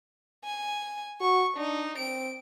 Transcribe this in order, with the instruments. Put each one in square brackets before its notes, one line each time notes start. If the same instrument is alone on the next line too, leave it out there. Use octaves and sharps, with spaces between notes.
[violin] G#5
[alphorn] F#4 [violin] C#6
[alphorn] D4 [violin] D#4
[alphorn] C4 [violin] D7